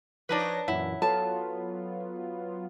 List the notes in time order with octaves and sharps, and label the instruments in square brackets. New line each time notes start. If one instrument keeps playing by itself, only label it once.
[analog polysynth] F3 C#5 A#6 [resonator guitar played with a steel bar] D4 D#4 B4
[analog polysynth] F#2 A#2 E3 [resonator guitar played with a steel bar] E4 [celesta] C#5 E5 F#5
[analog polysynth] F#3 B3 F4 [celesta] A4 C#5 [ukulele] A5